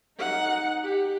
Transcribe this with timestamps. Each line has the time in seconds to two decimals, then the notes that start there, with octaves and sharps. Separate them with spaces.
0.18 D#4 F#5
0.83 G4